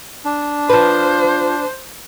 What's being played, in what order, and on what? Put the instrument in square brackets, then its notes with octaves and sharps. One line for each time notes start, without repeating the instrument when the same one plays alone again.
[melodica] D4
[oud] F3 B4 [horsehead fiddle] C5